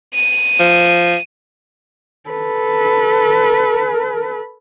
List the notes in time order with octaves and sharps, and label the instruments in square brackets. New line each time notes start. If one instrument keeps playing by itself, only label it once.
[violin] D#7
[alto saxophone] F3
[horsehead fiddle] A4 B4